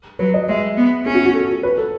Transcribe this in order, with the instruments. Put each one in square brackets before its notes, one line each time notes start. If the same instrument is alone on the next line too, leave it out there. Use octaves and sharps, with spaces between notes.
[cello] F#3 [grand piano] B4
[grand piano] D#5
[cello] G#3 [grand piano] E5
[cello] B3
[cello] C#4 [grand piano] G#4
[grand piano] F#4
F#4
A4
B4
A4